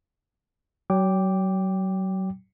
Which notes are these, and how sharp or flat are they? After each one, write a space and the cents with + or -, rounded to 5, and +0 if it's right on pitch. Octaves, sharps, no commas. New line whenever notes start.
F#3 +35 G5 +0 D6 +0